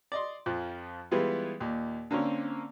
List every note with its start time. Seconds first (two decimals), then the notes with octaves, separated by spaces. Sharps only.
0.12 D5 D#5 C6
0.46 F2 F3
1.11 E3 G3 G#3 B3 F4
1.60 D#2 A#2
2.11 D3 A#3 C4 C#4